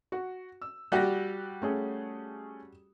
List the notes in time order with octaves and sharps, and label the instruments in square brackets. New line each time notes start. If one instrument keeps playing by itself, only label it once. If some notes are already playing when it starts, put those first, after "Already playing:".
[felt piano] F#4
E6
[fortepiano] G3 F#4 G4 [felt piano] F#6 A#6
[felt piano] A3 C#4 G#4